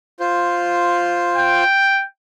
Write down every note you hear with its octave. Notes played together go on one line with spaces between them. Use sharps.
F4 C5
G5